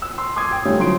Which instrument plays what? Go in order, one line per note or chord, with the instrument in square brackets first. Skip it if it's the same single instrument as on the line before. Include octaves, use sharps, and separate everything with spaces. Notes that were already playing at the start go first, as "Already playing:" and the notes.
[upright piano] E6
C6
C6 D6 D#6 G#6
G5
D3 G3 A3 C#4 D#4 F4
F3 F#3 F4 C6 D7